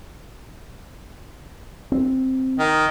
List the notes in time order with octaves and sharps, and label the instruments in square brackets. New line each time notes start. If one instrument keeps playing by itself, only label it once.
[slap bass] C4
[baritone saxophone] D#3